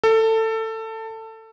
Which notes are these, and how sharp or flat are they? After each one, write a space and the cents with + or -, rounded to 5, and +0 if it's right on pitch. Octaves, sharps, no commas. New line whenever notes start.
A4 +20